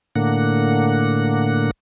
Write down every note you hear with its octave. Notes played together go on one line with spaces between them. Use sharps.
A2 D3 A#3 F#5